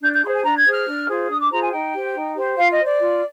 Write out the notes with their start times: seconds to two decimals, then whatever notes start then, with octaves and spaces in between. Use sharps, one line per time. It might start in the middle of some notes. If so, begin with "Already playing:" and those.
0.02 D4 G6
0.12 G6
0.23 G#4 C6
0.27 C5
0.34 G#5
0.44 D4 A#5
0.58 G#6
0.65 G#4 C5
0.72 F6
0.87 D4
1.08 F4 G#4 C5
1.29 D4 D#6
1.39 D6
1.50 F4 G#4 C5 A#5
1.61 G#5
1.71 D#4 G5
1.93 G4 C5
2.14 D#4
2.35 G4 C5
2.56 F4 F5
2.70 D#5
2.78 C5
2.85 D5
2.99 F4